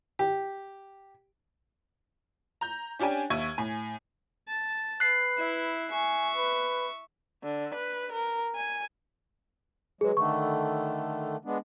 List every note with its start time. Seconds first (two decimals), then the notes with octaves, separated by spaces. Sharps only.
0.19 G4
2.61 A#5 G6
2.99 C#4 D4 G4 G5 G#5
3.30 D#2 E5 C#6 G#6 D#7
3.58 A2 G#5
4.48 A5
5.00 B4 F#6 C7
5.38 E4 E5
5.91 E5 G#5 C#6
6.36 B4
7.43 D3
7.74 B4
8.12 A#4
8.56 G#5
10.01 F#3 G#3 G#4 B4
10.17 D3 D#3 A3 C#6
11.45 G#3 B3 D4